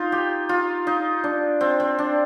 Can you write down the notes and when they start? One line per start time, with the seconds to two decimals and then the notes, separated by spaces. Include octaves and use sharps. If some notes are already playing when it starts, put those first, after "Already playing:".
Already playing: D#4 F4
0.12 G4
0.49 F4
0.87 D#4
1.24 D4
1.61 C4
1.80 C4
1.99 D4